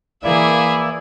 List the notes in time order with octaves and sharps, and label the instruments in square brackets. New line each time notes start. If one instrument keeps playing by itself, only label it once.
[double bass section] E3 [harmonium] A#3 D5 [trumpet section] E4 [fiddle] G#4 E5